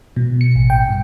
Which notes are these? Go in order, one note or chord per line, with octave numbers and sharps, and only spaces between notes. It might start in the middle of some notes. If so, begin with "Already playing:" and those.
B2
C#7
A1
G5
G2